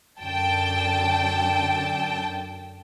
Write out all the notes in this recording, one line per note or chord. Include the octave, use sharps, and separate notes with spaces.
F#2 D3 G5 A5